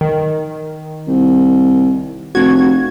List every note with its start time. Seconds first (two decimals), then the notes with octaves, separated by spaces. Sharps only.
0.01 D#3
1.07 C2
2.35 F1 F#4 G#6